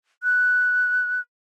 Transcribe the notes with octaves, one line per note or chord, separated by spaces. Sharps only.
F#6